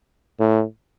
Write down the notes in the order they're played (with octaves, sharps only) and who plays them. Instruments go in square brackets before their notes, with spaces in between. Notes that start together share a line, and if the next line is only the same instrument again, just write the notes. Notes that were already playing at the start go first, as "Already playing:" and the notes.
[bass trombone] A2